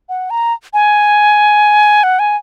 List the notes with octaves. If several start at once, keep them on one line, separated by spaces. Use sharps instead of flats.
F#5
A#5
G#5
F#5
G#5